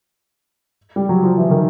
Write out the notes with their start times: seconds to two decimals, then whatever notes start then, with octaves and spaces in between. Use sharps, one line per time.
0.96 G3
1.09 F#3
1.24 F3
1.37 E3
1.51 D#3